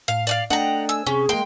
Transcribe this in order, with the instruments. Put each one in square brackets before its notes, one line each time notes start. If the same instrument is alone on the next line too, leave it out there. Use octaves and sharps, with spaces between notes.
[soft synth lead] A2 [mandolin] F5
[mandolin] D5 D#5 F5
[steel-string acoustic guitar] A3 D4 D#5 [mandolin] F#5 A#5 [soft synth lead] G5
[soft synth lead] G#5 [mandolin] E6
[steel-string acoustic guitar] C3 [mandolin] C#4 [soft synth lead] G#4
[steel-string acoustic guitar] G#3 A#3 [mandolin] G5 C6